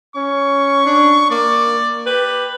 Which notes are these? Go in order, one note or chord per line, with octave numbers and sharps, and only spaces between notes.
C#4 C#6
D4
A#3 D5
G4 B4